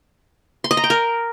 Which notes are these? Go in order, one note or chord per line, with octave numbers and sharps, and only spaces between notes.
C6
D#5
A#5
G5
A#4